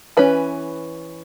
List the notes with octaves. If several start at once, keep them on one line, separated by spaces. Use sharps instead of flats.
E3 C#4 B4